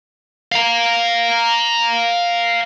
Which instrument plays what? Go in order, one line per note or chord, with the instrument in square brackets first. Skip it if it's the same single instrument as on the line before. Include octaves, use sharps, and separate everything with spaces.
[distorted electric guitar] F5 A#5